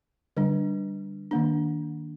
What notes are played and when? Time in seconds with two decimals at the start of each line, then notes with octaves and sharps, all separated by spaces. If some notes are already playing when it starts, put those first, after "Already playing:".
0.37 D3 G3 D4
1.31 D#3 A#3 D4